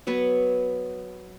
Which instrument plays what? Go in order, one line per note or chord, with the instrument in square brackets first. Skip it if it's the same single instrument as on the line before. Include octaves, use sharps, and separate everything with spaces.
[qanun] F#3 B3 B4 C#5